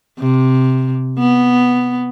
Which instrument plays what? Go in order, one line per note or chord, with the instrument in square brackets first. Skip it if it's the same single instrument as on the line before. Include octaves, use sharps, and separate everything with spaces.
[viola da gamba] C3
B3